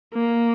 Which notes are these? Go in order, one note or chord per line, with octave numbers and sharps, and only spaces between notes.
A#3